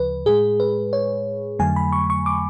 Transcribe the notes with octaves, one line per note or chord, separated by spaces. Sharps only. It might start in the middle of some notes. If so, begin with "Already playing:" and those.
Already playing: D2 C#3 F3 B4
A2 G#3 G#4
B4
C#5
F2 D3 F#3 A3 G#5
B5
C#6
C#6
D6